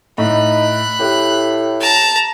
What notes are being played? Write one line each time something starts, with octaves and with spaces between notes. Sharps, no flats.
A2 D#4 B5 F#6
A2 G4
A5 A#5